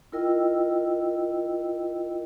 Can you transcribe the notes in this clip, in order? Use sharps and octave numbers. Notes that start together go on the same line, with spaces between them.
E4 F4 A#4 D#5 G5 E6